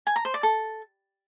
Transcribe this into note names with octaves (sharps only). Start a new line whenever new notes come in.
G#5
A#5
C5
D5
A4